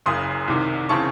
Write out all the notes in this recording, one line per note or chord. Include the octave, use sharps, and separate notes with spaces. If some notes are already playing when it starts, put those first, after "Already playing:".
F#1 F#2 C#3 C6 D#6
C2 C3 D#3
C#3 E3 C4 A5 C#6